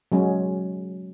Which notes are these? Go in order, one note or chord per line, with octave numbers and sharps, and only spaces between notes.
F#3 G#3 C#4